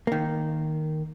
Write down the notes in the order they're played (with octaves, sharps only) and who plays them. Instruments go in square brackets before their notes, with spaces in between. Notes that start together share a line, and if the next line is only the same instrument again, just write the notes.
[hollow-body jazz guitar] D#3 A#3